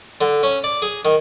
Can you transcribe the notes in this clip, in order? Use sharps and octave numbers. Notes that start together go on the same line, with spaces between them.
D3
C#4
D5
G#4
D#3